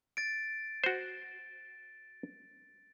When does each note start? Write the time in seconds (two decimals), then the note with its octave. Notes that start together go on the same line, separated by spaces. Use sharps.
0.17 A6 D7
0.84 F#4 C5